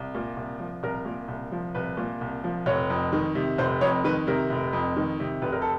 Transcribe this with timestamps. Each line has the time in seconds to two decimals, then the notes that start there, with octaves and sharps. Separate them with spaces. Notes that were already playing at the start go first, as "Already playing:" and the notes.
Already playing: C2
0.15 A#2
0.37 C2
0.60 F3
0.83 C2 A#4
1.05 A#2
1.28 C2
1.52 F3
1.75 C2 B4
1.97 A#2
2.21 C2
2.44 F3
2.66 F1 C#5
2.90 F2
3.13 D#3
3.35 C3
3.58 F1 C5
3.81 F2 C#5
4.04 D#3 B4
4.27 C3 A#4
4.50 F1
4.73 F2
4.96 D#3
5.20 C3
5.42 F1 B4
5.52 A#4
5.62 A4